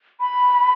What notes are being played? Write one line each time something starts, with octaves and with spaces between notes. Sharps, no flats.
B5